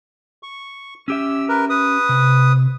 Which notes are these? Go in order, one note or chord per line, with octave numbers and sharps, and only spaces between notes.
C#6
C#4 G4 E5 E6
A#4 B4
B4 D#6
C3